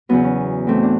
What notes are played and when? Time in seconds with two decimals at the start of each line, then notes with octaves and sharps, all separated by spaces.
0.09 E2 C#3 F#3 B3
0.24 C#4
0.67 A2 E3 A3 C4
0.83 D4